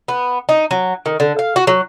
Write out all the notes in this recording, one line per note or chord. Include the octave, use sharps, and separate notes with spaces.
B3
D#4
F#3
D#3
D3
F5
F#4
F#3